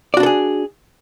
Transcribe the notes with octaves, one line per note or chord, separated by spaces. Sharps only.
D4 F#4 G#4 A4 D5